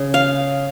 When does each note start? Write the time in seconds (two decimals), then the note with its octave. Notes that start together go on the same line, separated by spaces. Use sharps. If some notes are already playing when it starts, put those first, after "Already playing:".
Already playing: C#3
0.14 F5